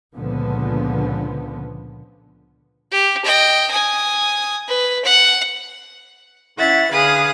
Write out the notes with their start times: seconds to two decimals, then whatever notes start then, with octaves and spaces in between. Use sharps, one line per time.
0.14 C#2 A#2 D3 F3 B3
2.91 G4
3.25 D#5 G5
3.71 G#5 D#6
4.68 B4
5.05 F#5
6.58 C#4 E4 E5 F#5 A6
6.91 D3 G#4 B4 F5 D#6 F#6